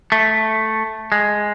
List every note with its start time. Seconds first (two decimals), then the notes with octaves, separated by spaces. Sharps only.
0.12 A3
1.12 G#3